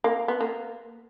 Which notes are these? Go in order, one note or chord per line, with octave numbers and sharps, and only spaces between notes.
A#3
B3
A#3